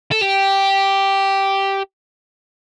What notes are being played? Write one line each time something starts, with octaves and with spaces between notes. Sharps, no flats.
A4
G4